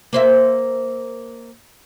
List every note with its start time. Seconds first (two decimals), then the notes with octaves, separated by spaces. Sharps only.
0.13 A#3 C5 E5